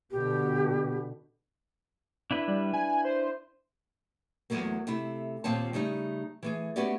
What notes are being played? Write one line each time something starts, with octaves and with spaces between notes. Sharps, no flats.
B2 D3 G4
D4 E4 B4
G3
G#5
C5
E2 G#2 F#3 A3 A#3
C3 A3 E4
D#2 A#2 F3 C4 C#5 A5
C#3 G3 A3 D#4
E3 A3 G#4
A3 B3 C#4 F#4 G4 D5